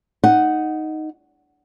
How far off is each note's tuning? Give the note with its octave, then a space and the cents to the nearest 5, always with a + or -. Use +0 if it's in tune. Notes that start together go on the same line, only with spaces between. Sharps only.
D#4 +0 F#5 +0